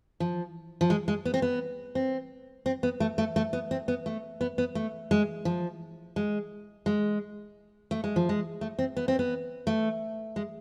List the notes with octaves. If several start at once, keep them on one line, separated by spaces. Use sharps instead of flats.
F3
F3
G#3
G#3
B3
C4
B3
C4
C4
B3
A3
A3
A3
B3
C4
B3
A3
B3
B3
A3
G#3
F3
G#3
G#3
A3
G#3
F3
G#3
A3
C4
B3
C4
B3
A3
G#3